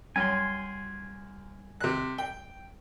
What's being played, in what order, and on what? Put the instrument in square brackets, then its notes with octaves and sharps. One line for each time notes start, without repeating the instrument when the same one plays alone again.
[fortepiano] F#2 [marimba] G3 C#5 [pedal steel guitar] G#5 C6
[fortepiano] C3 F#6
G5